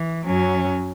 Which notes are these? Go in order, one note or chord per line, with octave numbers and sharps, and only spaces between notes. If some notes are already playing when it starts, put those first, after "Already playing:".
Already playing: E3
F#2 F#3 C#4